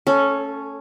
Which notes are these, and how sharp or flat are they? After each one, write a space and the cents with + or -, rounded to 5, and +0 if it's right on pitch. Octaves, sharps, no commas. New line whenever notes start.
A3 +35 C#4 +0 A4 -10